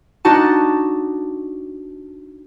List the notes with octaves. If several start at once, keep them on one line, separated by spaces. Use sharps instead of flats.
D4 D#4 F#4 A5